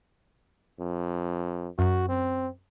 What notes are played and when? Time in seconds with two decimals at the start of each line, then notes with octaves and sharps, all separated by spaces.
0.80 F2
1.79 F#2 F#4
2.09 C4